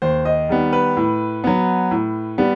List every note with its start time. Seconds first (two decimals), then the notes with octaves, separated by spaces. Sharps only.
0.02 D#2 C5
0.25 D#5
0.49 D#3 G3 B3
0.73 B4
0.97 A2
1.44 F#3 B3
1.91 A2
2.38 G3 B3